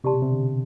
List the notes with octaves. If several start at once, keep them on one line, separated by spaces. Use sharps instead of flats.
C3 G4 D5 A5 C6
B2
C3
D3